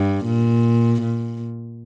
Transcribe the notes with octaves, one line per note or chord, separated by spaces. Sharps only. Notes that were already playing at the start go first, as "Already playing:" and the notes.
Already playing: G2
A#2
A#2